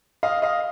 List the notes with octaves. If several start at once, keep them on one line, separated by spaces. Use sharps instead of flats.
D#5 F5
D#5 F5